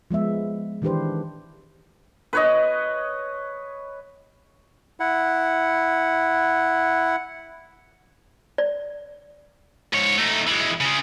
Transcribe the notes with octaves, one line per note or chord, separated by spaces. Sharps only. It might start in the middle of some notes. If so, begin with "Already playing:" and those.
F3 G#3 B3 E5
D#3 E3 D4 G4 B4 C5
B4 C#5 D#5
E4 F#5
D5
G#2 C#5
A3 D#4
E3 G#3
C#3 G#3